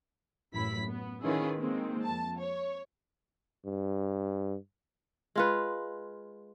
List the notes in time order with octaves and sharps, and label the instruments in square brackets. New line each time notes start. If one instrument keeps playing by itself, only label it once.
[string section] A1 F#2 E4 B5 B6
B3
D#3 C#4 E4 F4 G#4 B4
D#3 G#3 A#3 C4
F2 A5
C#5
[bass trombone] G2
[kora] G#3 F4 B4